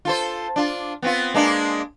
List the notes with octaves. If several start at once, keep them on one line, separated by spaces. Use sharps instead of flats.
F4 A4 C5
D4 F4
B3 C4 F4
G#3 A#3 D4